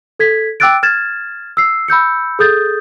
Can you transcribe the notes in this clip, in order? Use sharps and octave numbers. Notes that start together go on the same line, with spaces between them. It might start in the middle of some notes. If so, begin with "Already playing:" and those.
A4 G#6 B6
G5 D6 E6 F#6 A6 D7
F6 G#6 A6 E7
E6 C7
B5 E6 G6 C#7
G#4 A4 D#6 G6 A6